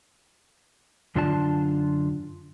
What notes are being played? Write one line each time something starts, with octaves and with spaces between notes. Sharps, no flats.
F#2 D3 D4 F4 D5 A5